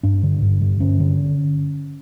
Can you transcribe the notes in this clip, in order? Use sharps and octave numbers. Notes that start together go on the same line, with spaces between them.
G2 D4
D3
G2
D3
G2 C#4
D3